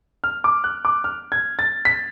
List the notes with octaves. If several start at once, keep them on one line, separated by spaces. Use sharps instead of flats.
F6
D6
F#6
D6
F6
G#6
A6
B6